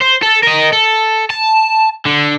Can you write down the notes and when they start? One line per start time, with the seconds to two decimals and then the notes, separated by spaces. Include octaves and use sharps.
0.01 C5
0.22 A4
0.43 A#4 D#5
0.73 A4
1.30 A5
2.05 D3